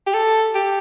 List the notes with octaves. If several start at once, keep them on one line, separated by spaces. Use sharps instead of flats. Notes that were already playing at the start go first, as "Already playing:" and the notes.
G4
A4
G4